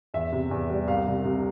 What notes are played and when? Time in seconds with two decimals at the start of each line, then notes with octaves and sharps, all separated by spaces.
0.14 E2 E5
0.32 C3
0.51 E2
0.70 G3
0.88 C2 F5
1.06 C3
1.25 C3